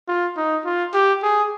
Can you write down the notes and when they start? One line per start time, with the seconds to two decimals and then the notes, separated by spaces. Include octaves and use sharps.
0.08 F4
0.37 D#4
0.65 F4
0.94 G4
1.23 G#4